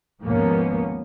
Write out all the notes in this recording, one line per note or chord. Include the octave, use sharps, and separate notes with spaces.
D#2 G#2 F3 A#3 B3 C#4